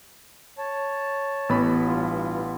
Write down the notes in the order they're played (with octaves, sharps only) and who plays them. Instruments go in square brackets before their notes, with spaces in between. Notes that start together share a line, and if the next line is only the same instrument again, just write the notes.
[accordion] C#5 A5
[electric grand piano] A1 B3 B5
[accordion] G2 F4